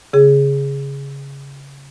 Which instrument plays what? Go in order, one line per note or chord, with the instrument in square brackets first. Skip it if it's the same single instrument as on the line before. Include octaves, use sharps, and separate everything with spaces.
[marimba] C#3 G#4